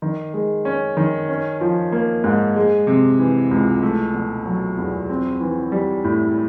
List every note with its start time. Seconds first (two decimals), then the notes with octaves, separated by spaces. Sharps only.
0.02 D#3
0.34 G#3
0.65 C#4
0.97 D#3
1.29 C#4
1.61 F3
1.92 A#3
2.24 G#2
2.56 G#3
2.87 C3
3.19 E3
3.51 C#2
3.83 A3
4.14 B2
4.46 F#3
4.77 E2
5.09 C4
5.41 E3
5.72 G3
6.04 A2